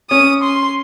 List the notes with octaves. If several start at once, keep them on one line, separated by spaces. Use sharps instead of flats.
C#4 D#6
C6